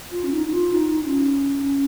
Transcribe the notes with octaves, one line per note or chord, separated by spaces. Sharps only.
F4
C#4
D#4
D#4
F4
D#4
C#4